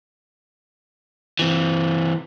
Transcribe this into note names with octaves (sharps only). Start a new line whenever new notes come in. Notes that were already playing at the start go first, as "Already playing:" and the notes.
E3 C4